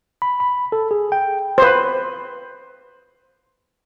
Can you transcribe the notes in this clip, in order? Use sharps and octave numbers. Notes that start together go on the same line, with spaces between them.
B5
B5
A4
G#4
G5
B4 C5